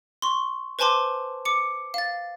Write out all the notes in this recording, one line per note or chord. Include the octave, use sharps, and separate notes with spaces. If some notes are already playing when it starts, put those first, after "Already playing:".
C6 C#6
B4 C5 G#5 A5 C6 D6
D6 C#7
F5 A6